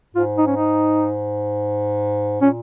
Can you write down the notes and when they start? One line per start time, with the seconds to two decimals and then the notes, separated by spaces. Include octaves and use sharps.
0.15 G#2 F4
0.38 D#4
0.47 C#4
0.56 D#4
2.41 A#2 C#4